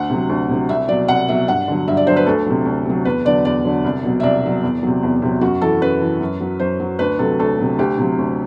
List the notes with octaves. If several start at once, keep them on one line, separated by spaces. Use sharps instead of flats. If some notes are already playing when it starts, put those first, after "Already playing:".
Already playing: D2 F#5
C3 F#3
D2
C3 F#3
C2 E5
B2 F#3 D5
C2 F#5
B2 F#3 E5
G2 F#5
D3 F#3
G2 E5
D5
D3 F#3 C5
B4
D2 A4
C3 F#3
D2
C3 F#3
E2 B4
D3 F#3 D5
E2 D5
D3 F#3
C2
B2 F#3
E5
C2 D5
B2 F#3
E2
C3 F#3
E2
C3 F#3
F#2 F#4
E3 A4
F#2 B4
E3
F#2
F#3
F#2 C5
F#3
D2 B4
C3 F#3 A4
D2 A4
C3 F#3
D2 G4
C3 F#3
D2